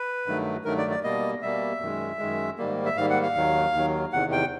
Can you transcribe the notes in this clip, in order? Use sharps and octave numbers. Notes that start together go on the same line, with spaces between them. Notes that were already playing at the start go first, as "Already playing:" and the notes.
Already playing: B4
G2 D#3 F#3 A3
G2 D#3 F#3 A3 A#4
D5
D5
B2 G3 A#3 D#5
B2 G3 A#3 E5
F#2 D#3 G#3
F#2 D#3 G#3
G#2 D#3 G3 A#3
E5
G#2 D#3 G3 A#3 F5
F#5
F5
D#2 D#3 F#3
D#2 D#3 F#3
E2 C3 D#3 F#5
G5